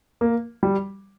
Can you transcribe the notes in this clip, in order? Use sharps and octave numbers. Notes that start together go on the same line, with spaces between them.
A#3
G3